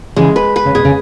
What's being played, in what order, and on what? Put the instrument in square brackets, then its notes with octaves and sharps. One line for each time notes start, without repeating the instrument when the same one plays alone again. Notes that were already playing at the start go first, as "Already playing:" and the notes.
[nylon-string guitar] C#3 E3 [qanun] G#3
[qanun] B4
B4
[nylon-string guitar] C#3
[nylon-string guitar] B2 [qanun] G#4
[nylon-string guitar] C#3